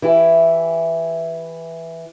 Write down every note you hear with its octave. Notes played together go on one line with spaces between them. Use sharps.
E3 E4 G4